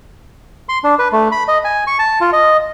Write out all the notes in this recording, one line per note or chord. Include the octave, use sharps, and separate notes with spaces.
C6
D4
B4
A3
B5
D#5
G#5
C#6
A5
F4
D#5